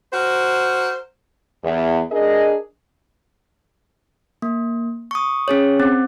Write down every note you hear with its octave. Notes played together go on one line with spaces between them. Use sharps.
F#4 A#4 C5
E2
D4 G#4 A#4 D#5
A#3
C#6 D#6
C#4 G#4 C#5
C4